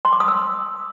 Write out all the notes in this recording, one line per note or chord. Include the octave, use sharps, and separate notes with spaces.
C6
D6
D#6
E6